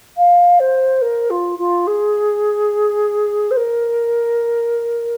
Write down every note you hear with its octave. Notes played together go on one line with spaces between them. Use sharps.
F5
C5
A#4
F4
F4
G#4
C5
A#4